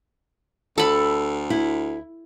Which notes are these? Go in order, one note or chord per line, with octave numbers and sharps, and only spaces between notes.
D2 A4 B5
E4